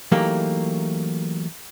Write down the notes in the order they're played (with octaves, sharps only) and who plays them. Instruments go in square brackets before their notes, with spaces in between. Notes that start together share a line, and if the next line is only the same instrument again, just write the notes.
[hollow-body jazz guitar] E3 F#3 A3 A#3 D#4 G4